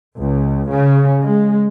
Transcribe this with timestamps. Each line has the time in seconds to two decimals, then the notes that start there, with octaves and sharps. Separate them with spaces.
0.17 C#2
0.71 C#3
1.21 G#3